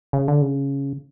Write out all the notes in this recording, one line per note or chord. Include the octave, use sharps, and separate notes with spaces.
C#3
D3
C#3